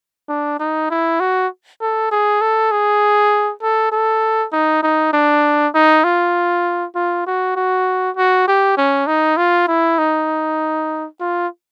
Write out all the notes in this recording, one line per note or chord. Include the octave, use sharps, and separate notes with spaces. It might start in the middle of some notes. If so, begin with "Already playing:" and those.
D4
D#4
E4
F#4
A4
G#4
A4
G#4
A4
A4
D#4
D#4
D4
D#4
F4
F4
F#4
F#4
F#4
G4
C#4
D#4
F4
E4
D#4
F4